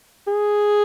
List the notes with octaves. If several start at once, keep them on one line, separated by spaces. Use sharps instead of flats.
G#4